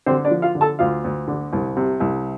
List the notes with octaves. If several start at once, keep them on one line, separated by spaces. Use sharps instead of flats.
D3 C4 C5
D4 D5
F3
F4 F5
D3
A4 A5
D2 F4 F5
D2
D3
C2
C3
C2